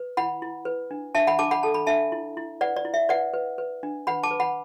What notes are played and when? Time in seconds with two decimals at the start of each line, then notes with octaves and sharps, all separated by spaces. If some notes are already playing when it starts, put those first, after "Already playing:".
Already playing: B4
0.17 E4 F#5 B5
0.42 E4
0.65 B4
0.91 D4
1.15 D4 E5 A5
1.27 F#5 B5
1.39 D4 A5 D6
1.51 F#5 B5
1.63 A4 A5
1.74 B5
1.87 D4 E5 A5
2.12 E4
2.37 E4
2.61 B4 D5 F#5
2.77 D5
2.85 E4
2.94 E5
3.09 B4 D5 F#5
3.34 B4
3.58 B4
3.83 D4
4.07 B4 F#5 B5
4.23 A5 D6
4.31 B4
4.40 F#5 B5